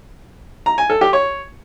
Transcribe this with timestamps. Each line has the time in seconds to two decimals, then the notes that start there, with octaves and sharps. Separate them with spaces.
0.66 A#5
0.78 G#5
0.90 A4
1.01 G4
1.13 C#5